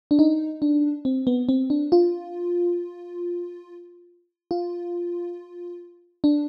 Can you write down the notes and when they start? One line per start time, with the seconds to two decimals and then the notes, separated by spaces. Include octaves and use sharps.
0.11 D4
0.19 D#4
0.62 D4
1.05 C4
1.27 B3
1.49 C4
1.70 D4
1.92 F4
4.51 F4
6.24 D4